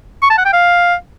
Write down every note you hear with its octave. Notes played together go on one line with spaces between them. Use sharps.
C#6
A5
F#5
G5
F5